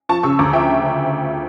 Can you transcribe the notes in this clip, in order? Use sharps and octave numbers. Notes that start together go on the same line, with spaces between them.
F3 A5 C#6
C#3 C#6 E6
D2 A#5 D6
F3 E5 G5